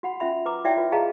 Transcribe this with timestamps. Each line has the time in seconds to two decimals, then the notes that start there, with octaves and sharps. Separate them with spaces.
0.03 F#4 F#5 B5
0.20 C#4 F4 E5 B5
0.46 B4 A#5 D6
0.64 E4 F#4 C#5 D5 E5 G5
0.77 F4 B4
0.92 G#4 B4 D#5 F5 A5 A#5